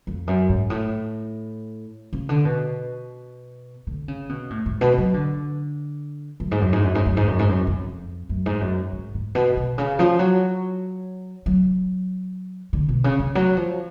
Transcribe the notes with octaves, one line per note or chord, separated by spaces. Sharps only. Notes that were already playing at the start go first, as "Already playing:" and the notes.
F2
F#2
G#2
A2
C#3
D3
B2
D3
C#3
B2
A2
G#2
B2
F#3
D3
F#2
G#2
F#2
G#2
F#2
G#2
F#2
G#2
F#2
G#2
F#2
F2
F#2
G#2
F#2
G#2
G#2
B2
B2
C#3
F3
F#3
F#3
D3
B2
C#3
D3
F#3
F3